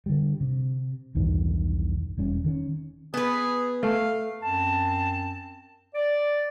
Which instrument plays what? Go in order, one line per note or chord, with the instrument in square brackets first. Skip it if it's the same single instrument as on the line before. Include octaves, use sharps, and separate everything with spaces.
[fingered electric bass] D3 G3
C3
B1 E2 G2 D#3
E1 G3 C#4
D#3 C#4
[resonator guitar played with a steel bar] B3 B4 [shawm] G#4
[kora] A3 [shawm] F5
[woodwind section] F#2 C4 A5
D5